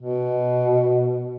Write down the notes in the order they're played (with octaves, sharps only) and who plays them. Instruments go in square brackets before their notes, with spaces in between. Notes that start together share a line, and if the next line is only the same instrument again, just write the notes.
[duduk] B2